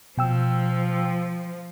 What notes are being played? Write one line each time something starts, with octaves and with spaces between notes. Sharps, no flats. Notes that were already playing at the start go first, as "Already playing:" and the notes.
B2 F3 G5 E6